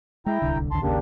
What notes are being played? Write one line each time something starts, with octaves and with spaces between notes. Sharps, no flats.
G#3 E4 G5 A#5
D1 C2 D3
A#1 D#2 D3 A5 C6
G#1 D#2 C#3 A#3 D4 G4